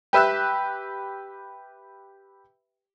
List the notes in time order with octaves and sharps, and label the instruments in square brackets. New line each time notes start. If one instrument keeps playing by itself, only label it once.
[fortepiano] G4 B4 E5 E6 F#6